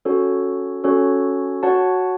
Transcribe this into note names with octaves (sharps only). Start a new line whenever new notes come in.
C#4 F#4 A4 C#5
C#4 F#4 A4 C#5
F#4 C#5 F#5 A5